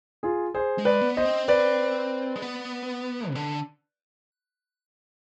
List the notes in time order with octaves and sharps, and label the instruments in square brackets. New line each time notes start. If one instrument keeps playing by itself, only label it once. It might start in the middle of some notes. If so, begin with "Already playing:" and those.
[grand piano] F4 G#4
G#4 C5
[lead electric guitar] G#3
[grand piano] B4 D5
[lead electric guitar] B3
[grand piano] C5 D#5
[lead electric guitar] C4
[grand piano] B4 D5
[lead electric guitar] G#3
B3
C3
D3